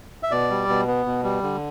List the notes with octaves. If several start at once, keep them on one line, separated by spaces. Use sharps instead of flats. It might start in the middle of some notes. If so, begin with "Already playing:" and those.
E5
B2 D5
G3
B2
B3
B2
G3
D3